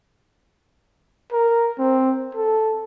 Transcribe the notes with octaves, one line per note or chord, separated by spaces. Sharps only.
A#4
C4
A4